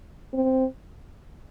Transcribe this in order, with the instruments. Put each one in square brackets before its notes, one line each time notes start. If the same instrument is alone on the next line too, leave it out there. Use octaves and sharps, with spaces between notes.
[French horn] C4